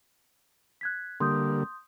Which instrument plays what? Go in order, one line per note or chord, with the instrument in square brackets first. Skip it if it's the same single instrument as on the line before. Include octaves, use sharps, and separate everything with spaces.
[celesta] F#6 G#6 B6
[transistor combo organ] D3 G3 A#3 [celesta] C6 D#6 G6